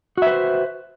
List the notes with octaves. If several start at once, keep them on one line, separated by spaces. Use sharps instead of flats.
F#4 B4 C5 E5